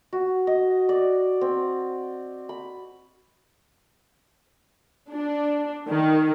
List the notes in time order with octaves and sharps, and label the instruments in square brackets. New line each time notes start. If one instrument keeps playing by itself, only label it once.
[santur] F#4
D#5
D5
C4
B5
[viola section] D4
D#3